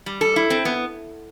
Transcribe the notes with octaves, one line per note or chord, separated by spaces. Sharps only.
G3
A4
E4
C4
B3